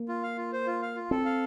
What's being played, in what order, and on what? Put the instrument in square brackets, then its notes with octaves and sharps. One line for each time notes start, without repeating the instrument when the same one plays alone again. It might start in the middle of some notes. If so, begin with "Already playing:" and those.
Already playing: [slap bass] A#3
[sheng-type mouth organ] F4
F5
F4
C5
F4
F5
F4
[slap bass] C4 [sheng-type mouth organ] A4
[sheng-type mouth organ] F5